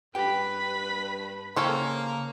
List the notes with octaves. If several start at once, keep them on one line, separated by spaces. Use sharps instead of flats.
G2 G4 B4 G5 B5
C#3 A#3 C#4 A4 C5 C#5 G5